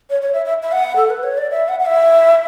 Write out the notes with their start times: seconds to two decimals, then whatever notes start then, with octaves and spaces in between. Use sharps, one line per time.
0.10 C#5
0.22 C#5
0.33 E5
0.45 E5
0.63 E5
0.72 F#5
0.96 A4
1.10 B4
1.23 C#5
1.38 D5
1.50 E5
1.69 F#5
1.79 F#5
1.85 E5